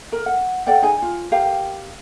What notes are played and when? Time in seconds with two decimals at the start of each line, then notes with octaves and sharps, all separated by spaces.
0.12 A#4
0.26 F#5
0.67 A4 D5 F#5 G5
0.82 D#4 G#4 G#5
1.02 F4
1.32 G4 A#4 F5 G5